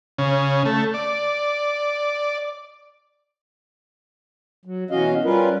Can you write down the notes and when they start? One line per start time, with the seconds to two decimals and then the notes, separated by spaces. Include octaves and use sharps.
0.18 C#3
0.65 A3
0.94 D5
4.65 F#3
4.91 B2 E3 C#4 F#4 D#5 F5
5.25 G3 C#4 F4 A#4 B4